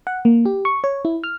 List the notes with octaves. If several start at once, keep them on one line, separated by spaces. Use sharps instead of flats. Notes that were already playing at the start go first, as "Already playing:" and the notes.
F#5
A#3
G4
C#6
C#5
E4
F6